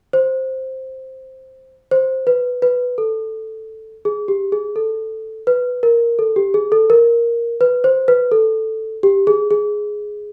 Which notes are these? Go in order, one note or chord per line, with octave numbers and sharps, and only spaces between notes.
C5
C5
B4
B4
A4
G#4
G4
G#4
A4
B4
A#4
A4
G4
G#4
A4
A#4
B4
C5
B4
A4
G4
G#4
G#4